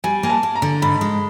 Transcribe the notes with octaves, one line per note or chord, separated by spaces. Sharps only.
G3 G#5
A#3 G#5
A5
A#3
A#5
D3
G#2 B5
G#3